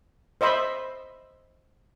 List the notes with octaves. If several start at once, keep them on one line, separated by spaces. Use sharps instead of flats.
C5 D#5 E5 B5 C6